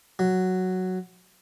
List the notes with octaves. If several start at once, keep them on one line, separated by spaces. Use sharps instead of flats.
F#3